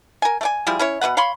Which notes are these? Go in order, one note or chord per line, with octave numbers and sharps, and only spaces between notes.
A#4 G#5
A3 D5 G#5
F3 G3 E4 G#4
C#4 E4 C#5
B2 D4 B4 F#5
C#5 F5 B5 C6